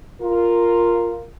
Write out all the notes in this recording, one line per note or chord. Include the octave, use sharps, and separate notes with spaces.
F4 A#4